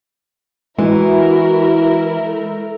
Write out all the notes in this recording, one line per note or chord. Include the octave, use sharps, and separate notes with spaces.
E3 G#3 E4 F#4 A#4
A4